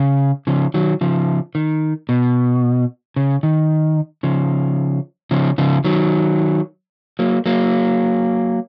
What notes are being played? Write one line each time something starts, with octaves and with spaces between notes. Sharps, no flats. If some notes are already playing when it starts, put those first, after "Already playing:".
Already playing: C#3
C#3 F3
D#3 F#3
C#3 F3
D#3
B2
C#3
D#3
C#3 F3
C#3 F3
C#3 F3
D#3 F#3
F#3 A#3
F#3 A#3